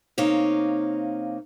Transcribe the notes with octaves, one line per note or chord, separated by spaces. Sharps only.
C3 A#3 D#4 C#5 F5